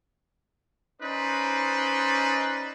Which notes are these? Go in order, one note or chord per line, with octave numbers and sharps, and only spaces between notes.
C#4 D#4 B4 C5 D5